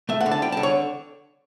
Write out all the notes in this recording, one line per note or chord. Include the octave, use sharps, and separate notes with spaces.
A3 E5
F#5
D3
A5
G3 G5
A5
D3
C#5